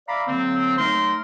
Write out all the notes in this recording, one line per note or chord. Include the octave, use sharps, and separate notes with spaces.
D5 E5 F5 A#5 B5 D6
D3 F#3 A#3 C4
F#3 A3 D#4 A#4 C6